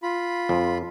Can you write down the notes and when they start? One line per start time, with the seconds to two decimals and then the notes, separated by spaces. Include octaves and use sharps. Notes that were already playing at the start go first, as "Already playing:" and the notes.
0.03 F4 B5
0.49 F2